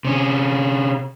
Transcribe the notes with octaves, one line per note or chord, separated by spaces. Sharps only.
C3 C#4